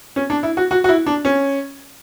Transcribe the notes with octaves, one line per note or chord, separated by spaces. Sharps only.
C#4
D4
E4
F#4
F#4
F#4
E4
D4
C#4